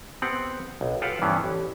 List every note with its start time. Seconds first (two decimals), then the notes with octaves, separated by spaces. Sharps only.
0.22 B3 C4 G4 F#5
0.81 B1
1.02 F4 G4 A4 B4 F5 F#5
1.22 G2 E3 B3 C#4 C5
1.44 A1